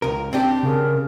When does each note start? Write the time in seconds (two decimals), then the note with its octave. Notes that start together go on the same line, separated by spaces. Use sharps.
0.02 C#2 A#4
0.33 C4 D4 G4 G5
0.63 C#3 A#4